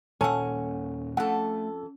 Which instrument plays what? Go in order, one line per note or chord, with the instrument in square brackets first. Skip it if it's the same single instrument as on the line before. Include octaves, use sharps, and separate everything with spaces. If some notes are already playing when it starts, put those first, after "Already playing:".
[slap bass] D#1 A#2 [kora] C#4 [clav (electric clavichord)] A4 [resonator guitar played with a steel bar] F#5 G#5
[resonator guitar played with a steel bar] F2 A4 [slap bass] A3 [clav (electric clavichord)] F#5